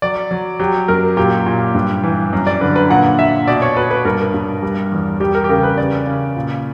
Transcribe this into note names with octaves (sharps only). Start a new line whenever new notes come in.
F#3 D5
F#3
F#3 G4
F#2 A#4
A#2 G4
A#2
G2
E3
F#2
D5
D3 B4
B4
A#2 F#5
A#2 E5
B2 D5
C#5
B2 B4
B4
G2 A#4
G2
G3
E2
G3 G4
A#4
G4
C#3 A#4
B4
C#3 D5
C#3
A#2